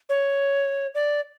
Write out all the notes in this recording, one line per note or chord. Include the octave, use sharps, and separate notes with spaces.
C#5
D5